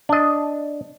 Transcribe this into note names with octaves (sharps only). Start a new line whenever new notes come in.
D4 D#5